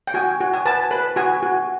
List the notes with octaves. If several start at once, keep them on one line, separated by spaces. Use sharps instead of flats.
G5
F#4 G#5
F#4
G#5
B4 A5
B4
F#4 G#5
F#4